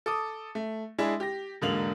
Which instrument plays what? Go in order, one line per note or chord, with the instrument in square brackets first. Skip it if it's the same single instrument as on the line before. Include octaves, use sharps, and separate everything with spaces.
[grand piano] A4 D6 D#6
A3
G#3 D4 E4 G#4
G4 A#6
E1 G#2 D3 A#3 F7 F#7